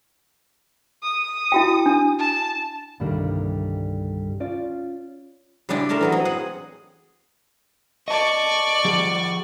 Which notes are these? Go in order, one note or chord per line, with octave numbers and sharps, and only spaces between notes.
D#6
E4 F#4 G5
D4
A5
C2 G2 D3 D#3 G3 A#3
C#4 F4 D5
C#3 G3 G#3 D4 E4 G4
A3 A#4 C#5 A5 C6
E3 F#3 G#4
C4 D#5
G#4 F#5
D5 D#5 A5 C#6
F3 G4 G#4